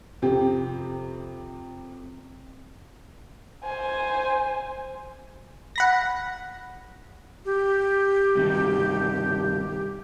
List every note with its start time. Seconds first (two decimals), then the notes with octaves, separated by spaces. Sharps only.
0.22 F2 C3 G4
3.64 C5 G#5
5.76 F#5 B5 A#6
7.45 G4
8.35 G2 C3 D#3